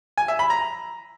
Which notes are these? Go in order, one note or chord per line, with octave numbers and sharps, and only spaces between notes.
G#5
E5
B5
A#5